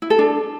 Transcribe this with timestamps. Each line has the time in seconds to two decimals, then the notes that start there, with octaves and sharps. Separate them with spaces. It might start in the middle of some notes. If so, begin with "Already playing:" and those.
0.02 E4
0.10 A4
0.19 D4